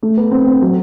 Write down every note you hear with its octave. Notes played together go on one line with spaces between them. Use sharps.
A3
B3
C4
C4
F#3